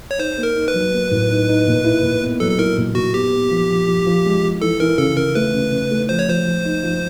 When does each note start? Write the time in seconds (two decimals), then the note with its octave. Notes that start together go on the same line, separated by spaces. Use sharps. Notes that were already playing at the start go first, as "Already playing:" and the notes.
0.11 C#5
0.18 D#4 C5
0.37 A#3
0.43 A#4
0.56 D#4
0.68 B4
0.74 F#3
0.93 A#3
1.11 A2
1.30 D#4
1.49 D#4
1.67 A#2
1.85 E4
2.03 A#2
2.22 B3
2.40 F#3 A4
2.51 A4
2.58 E4 A#4
2.78 A#2
2.95 A#2 F#4
3.13 B3 G4
3.33 B3
3.50 F3
3.69 F3
3.87 F3
4.06 F3
4.25 G#3
4.43 F3
4.61 E3 A4
4.80 E3 A#4
4.98 C#3 A4
5.17 C#3 A#4
5.35 A3 B4
5.53 C#3
5.72 C#3
5.91 A3
6.09 F3 C5
6.19 C#5
6.28 F3 C5
6.46 F3
6.65 D#4
6.83 F3